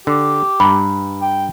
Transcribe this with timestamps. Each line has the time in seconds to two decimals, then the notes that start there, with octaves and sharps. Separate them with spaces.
0.07 D3 G4
0.60 G2 A#5 B5
1.22 G5